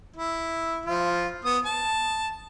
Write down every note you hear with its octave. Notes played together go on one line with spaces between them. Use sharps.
E4
F3 F4
B3 D#6
A5